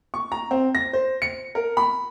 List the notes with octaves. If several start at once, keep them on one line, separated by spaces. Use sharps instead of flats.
C#6
A#5
C4
A#6
C5
C#7
A#4
B5